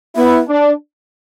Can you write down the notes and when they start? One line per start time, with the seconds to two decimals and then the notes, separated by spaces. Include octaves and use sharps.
0.16 B3 E4
0.48 D4